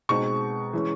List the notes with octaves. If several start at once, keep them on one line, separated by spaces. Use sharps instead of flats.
B2 G#3 C4 D#4 C#6
E3 G#3 C#4